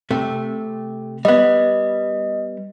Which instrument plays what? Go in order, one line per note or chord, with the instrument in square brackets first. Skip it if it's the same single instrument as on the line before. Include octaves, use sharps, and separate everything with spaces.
[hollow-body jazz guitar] C3 A3
[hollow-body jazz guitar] G3 B3 [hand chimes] D#5